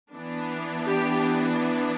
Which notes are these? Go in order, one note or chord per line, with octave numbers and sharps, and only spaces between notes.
E3 B3 D4
G4